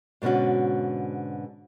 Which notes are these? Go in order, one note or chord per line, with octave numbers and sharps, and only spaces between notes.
G#2 B2 D3 C#4 F#4